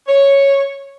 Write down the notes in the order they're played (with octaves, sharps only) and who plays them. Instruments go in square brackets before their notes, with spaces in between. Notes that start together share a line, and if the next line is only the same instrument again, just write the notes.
[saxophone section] C#5